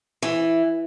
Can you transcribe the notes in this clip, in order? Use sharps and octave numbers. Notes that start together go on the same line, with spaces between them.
E3